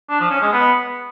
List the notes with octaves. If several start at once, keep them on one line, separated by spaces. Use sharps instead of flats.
D4
F3
C#4
G#3
B3